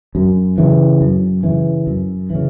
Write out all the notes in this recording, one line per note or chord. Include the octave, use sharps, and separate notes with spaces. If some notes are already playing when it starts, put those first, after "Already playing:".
F#2
C#3 E3
F#2
C#3 E3
F#2
C#3 E3